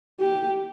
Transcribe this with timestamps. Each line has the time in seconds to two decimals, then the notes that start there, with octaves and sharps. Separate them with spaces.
0.20 G4